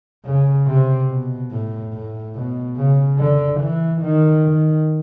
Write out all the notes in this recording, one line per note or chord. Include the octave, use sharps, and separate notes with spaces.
C#3
C3
B2
A2
A2
B2
C#3
D3
E3
D#3
D#3